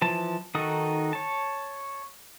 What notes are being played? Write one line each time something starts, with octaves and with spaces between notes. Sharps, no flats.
E3 F3 A5
D#3 D#4 F#4 A4 D#6
C#5 A5